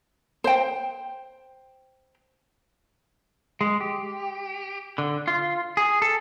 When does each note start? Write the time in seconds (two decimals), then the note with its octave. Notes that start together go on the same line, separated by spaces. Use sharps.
0.44 C5 G5
3.61 G#3
3.81 G4
4.98 D3
5.28 F4
5.77 G#4
6.02 A4